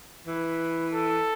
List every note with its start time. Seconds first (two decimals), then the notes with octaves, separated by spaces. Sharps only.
0.27 E3 B4
0.93 A4